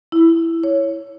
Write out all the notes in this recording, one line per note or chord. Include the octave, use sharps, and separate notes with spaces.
E4
C#5